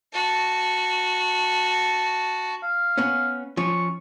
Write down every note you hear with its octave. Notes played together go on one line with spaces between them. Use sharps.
F#4 A5
F5
B3 C#4
F3 C#4 C#6